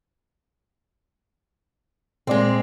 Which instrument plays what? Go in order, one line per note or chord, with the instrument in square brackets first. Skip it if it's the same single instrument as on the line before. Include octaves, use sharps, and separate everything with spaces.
[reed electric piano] A#2 D5 [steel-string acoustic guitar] G#3 C4